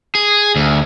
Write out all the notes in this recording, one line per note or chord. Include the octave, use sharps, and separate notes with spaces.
G#4
D2